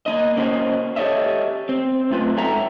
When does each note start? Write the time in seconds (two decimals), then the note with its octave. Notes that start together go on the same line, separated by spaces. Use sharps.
0.06 A#3 C4 D#5
0.37 A#3 C#4 F#4 A#4 C5 D#5
0.96 G4 A4 C#5 D#5 E5
1.69 C4
2.11 F#2 A3 F4 B4
2.37 G#2 F#3 A4 E5 G5 A#5